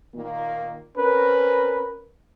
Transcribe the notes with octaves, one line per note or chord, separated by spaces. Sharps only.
A#2 D#3 A#3
C4 C#4 A#4 B4